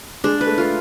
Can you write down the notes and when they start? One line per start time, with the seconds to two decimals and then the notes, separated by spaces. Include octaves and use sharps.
0.24 G#3 D4
0.41 B4
0.47 A3
0.58 A3 F4